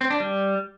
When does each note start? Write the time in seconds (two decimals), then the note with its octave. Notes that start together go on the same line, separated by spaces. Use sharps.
0.01 C4
0.10 D4
0.20 G3